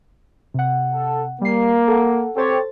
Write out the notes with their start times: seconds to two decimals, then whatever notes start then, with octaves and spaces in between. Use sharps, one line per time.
0.54 C3 F#5
0.94 A4
1.41 G3 A#3 C7
1.88 A4 F#5
2.37 C4 G4 A4 C5 C#5 A6